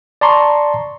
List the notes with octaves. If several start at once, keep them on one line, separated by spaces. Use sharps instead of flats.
D5 A5 A#5 C6 C#6